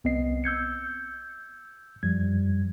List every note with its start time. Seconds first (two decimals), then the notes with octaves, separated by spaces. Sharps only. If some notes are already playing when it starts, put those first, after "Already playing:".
0.04 C2 B3 C4 D#5 C7
0.44 E6 G6 G#6 C#7
2.03 F#2 F3 G3 G#6